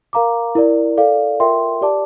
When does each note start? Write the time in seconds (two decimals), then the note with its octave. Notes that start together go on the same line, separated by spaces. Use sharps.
0.13 A#4 F5 A#5 D6
0.55 E4 A#4 D5
0.98 A4 D5 F5
1.40 F4 A#4 E5 G5 C6
1.81 G4 D5 A5 D6